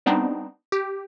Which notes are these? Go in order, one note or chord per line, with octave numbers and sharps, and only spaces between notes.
G3 B3 C4 D4 D#4
G4